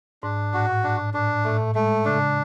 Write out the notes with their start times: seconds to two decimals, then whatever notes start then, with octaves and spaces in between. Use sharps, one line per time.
0.23 G#2 D4
0.53 A2 F#4
0.84 G#2 D4
1.14 A2 D4
1.45 A2 A3
1.75 G#3 A3
2.05 C#3 D4